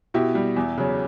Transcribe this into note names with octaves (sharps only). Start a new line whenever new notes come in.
B2 E4 G4
G3
E2
C#3 F#3